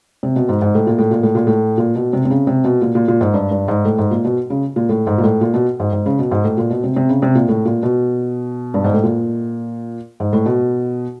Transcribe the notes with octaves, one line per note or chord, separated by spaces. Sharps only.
C3
B2
G#2
G#2
A2
A#2
A2
A#2
A2
A#2
A2
A#2
B2
C3
C3
C#3
C3
B2
A#2
A#2
A#2
G#2
G2
G2
G#2
A2
G#2
A#2
B2
C#3
A#2
A2
G#2
A#2
A2
A#2
B2
G#2
G#2
C#3
B2
G#2
A2
A#2
B2
C3
C3
C#3
C3
A#2
A2
A#2
B2
G2
G#2
A2
A#2
G#2
A2
B2